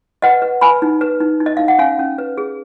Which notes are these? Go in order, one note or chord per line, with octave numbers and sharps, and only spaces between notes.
B4 D#5 F#5
B4
B4 G#5 B5
D#4
B4
D#4
D#4
D#5
D#4 F5
F#5
C#4 F5 G#5
C#4
B4
G#4